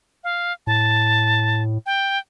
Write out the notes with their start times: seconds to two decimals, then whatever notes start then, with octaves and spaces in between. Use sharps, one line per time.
0.24 F5
0.67 A2 A5
1.86 G5